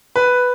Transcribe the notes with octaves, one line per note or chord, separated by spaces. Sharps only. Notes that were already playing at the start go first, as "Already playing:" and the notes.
B4